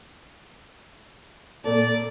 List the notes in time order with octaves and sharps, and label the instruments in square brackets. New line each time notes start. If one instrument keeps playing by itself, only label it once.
[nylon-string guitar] A#2 A4 A5 [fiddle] D5